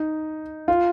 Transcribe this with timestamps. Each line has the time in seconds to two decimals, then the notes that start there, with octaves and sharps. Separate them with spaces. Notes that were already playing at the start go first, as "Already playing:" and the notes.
Already playing: D#4
0.68 F4